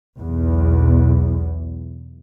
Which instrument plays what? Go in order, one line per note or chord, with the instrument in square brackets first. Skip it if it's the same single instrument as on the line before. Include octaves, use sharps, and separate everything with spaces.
[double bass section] B1 E2